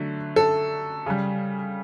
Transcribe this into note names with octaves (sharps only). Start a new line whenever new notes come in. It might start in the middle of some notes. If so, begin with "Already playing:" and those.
Already playing: D3 F#3 A3
A4
C#3 G3